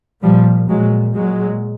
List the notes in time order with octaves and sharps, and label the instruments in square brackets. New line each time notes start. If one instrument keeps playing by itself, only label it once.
[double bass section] A#2 F3 G3
A#2 F#3 G#3
A#2 F#3 G#3